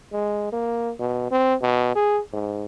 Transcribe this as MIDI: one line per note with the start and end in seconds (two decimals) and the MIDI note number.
0.12 0.49 56
0.52 0.92 58
0.99 1.28 47
1.31 1.55 60
1.62 1.91 47
1.95 2.20 68
2.33 2.66 44